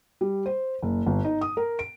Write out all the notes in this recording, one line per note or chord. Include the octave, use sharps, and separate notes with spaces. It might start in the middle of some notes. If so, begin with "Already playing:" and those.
G3
C5
F#1
G1
D#4
D#6
A#4
D7